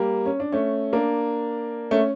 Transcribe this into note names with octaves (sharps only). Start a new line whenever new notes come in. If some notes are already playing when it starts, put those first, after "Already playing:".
Already playing: G3 A#3
C#4
D4
A3 C#4
A#3 D4
A3 C#4